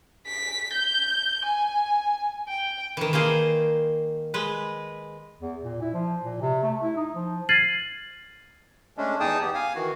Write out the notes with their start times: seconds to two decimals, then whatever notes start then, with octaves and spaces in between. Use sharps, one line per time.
0.26 B6
0.73 G6
1.45 G#5
2.48 G5
2.97 D#3 E3
3.13 D#3 A#3 G#4 C5
4.34 G#3 B4
5.40 E2
5.63 A#2
5.81 E4
5.94 F3
6.22 A#2
6.42 C3
6.63 A3
6.83 E4
6.97 D#4
7.15 F3
7.49 F6 G#6 A6 C7 D#7 F#7
8.97 G#3 A3 C#4 D4
9.20 E2 D#4 G#4 G5 A5 D#6
9.41 B3 G4
9.54 F5 G#5
9.75 D#3 E3 F#4